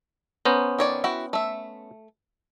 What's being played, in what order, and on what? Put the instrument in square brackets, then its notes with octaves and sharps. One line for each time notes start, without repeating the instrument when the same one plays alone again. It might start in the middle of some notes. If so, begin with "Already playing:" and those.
[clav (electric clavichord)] B3 C#4 C5 [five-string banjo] A#5
[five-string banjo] D#3 C#5 D5
E4 F#4 G5
A3 E5